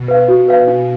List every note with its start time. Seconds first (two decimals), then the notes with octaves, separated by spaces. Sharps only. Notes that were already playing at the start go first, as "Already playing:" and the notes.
Already playing: B2
0.08 B4 F5
0.28 B2 F#4
0.48 B4 F5
0.67 D4